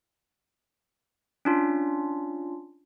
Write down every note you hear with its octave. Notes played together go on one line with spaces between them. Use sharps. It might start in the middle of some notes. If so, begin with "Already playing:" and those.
C#4 D4 F4